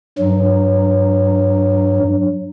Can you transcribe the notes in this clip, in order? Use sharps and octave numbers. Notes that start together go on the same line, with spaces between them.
G2 F#3